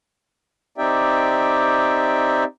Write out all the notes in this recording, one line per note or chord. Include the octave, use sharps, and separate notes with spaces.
C4 D#4 G4 D5 E5 G5